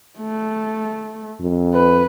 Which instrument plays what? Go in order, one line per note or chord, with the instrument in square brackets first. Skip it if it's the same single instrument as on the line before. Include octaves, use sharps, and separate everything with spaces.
[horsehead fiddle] A3
[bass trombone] F2
[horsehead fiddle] B4